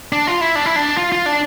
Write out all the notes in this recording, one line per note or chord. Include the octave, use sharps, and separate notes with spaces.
D4
F4
E4
D4
E4
D4
F4
F4
D4